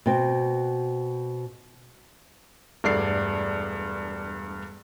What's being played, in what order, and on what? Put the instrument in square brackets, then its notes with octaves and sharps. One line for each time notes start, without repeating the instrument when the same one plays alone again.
[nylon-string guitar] B2 C4
[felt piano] E1 G2 A3 D5 C7